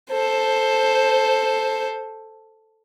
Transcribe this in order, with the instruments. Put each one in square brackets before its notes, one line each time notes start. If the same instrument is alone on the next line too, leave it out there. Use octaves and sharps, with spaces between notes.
[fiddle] A4 C5